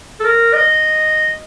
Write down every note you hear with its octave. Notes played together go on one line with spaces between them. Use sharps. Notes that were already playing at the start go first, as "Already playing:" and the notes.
A4
A#4
D#5